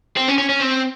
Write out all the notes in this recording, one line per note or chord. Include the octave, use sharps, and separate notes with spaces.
C4
C#4
C#4
C#4
C4